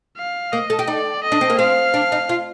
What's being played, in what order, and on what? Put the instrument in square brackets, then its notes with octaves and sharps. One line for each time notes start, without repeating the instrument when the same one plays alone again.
[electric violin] F5
[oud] A#3 [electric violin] D#5
[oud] A4
G4
[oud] D#4 [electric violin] D5
[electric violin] D#5
[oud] D4
C4
A#3
[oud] C4 [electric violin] F5
[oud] D4
D#4
F4